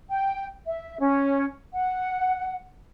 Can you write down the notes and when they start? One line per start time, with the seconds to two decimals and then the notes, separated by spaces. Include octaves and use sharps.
0.10 G5
0.66 E5
0.99 C#4
1.73 F#5